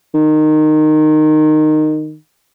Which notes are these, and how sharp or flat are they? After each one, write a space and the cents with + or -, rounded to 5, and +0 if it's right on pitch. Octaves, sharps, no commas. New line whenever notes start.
D#3 -15